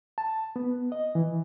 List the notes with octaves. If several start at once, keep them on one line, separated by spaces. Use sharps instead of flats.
A5
B3
D#5
E3